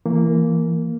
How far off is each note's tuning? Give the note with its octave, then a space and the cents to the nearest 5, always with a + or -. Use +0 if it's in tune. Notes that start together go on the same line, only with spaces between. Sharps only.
E3 +20 A#3 -5